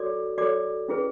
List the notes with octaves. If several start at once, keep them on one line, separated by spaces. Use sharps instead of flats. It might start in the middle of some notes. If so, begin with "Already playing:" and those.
Already playing: F#4 A4 C#5 D5 D6
F#4 A4 C#5 D5 D6
C#4 E4 G#4 B4